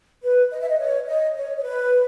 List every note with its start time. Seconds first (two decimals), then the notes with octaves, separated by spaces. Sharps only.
0.23 B4
0.51 D#5
0.60 E5
0.69 D#5
0.79 C#5
1.07 D#5
1.36 C#5
1.57 C#5
1.63 B4